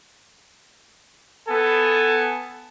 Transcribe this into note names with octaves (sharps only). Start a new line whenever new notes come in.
B3 A4 G#5